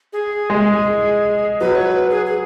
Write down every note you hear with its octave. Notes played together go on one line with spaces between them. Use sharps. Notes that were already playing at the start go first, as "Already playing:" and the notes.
G#4
G#3
F#3 B4
C#5
B4
G#4
G#4